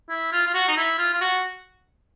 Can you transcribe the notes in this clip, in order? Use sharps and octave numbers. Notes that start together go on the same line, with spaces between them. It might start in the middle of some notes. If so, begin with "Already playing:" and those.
E4
F4
F4
F#4
D#4
E4
F4
F4
F#4